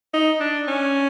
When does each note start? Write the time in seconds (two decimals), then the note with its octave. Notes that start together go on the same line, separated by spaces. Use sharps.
0.14 D#4
0.40 D4
0.68 C#4